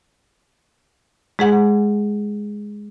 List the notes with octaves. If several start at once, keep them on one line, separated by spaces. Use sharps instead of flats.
G#3 G#4 F#5